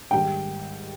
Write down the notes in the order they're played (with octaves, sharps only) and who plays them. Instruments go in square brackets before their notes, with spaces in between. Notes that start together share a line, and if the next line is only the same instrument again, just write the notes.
[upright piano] G#2 D#3 G3 G5